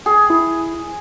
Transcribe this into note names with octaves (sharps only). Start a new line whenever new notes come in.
G#4
E4